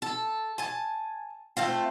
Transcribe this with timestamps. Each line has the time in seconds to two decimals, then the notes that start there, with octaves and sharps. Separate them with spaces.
0.02 A4
0.58 G#5 A5
1.57 A3 C4 F4